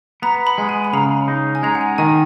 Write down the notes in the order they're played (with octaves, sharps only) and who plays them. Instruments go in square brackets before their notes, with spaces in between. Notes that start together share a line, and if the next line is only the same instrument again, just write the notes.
[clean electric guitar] B3 [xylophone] A#5
[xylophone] B5
[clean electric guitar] G#3
[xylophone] G#5
B5
[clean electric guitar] C#3 [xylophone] A#5
[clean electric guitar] D#4
[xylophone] G#5
[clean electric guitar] G#3 [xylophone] A#5
[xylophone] F#5
G#5
[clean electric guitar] D#3 [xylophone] G#5